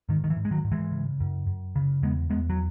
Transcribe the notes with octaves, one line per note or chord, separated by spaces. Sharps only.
G#2 D#3
D#3
E3
G#2
G#3
D#3 F#3
G#2
E3 G#3
C#3
F#2
F#2
C#3
E2 G#3 B3
E2 G#3 B3
F#3